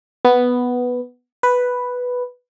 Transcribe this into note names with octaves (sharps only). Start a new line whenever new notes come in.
B3
B4